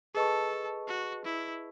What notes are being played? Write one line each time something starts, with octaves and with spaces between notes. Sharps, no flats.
G#4 A4 B4 D#5 A5 C#6
F#4
E4